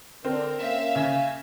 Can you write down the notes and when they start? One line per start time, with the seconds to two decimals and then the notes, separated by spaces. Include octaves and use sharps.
0.25 D3 C4 A#4
0.58 A#3 C#4 E5 F5
0.95 C#3 G#5